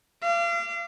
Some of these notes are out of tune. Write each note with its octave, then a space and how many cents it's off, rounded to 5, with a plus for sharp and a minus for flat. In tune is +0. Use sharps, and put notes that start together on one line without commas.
F5 -35 D6 +0